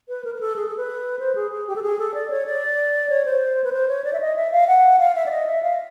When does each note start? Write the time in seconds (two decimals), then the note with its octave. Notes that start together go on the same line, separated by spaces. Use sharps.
0.09 B4
0.25 A#4
0.35 A#4
0.41 A4
0.56 G#4
0.67 A4
0.77 B4
1.19 C5
1.35 G#4
1.51 G#4
1.67 G4
1.76 A4
1.83 G#4
1.99 A4
2.14 D5
2.30 C#5
2.46 D5
3.09 C#5
3.25 C5
3.64 B4
3.72 C5
3.88 C#5
4.04 D5
4.13 E5
4.20 D#5
4.36 E5
4.52 F5
4.67 F#5
4.99 F5
5.15 E5
5.26 D5
5.31 D#5
5.46 E5
5.63 F5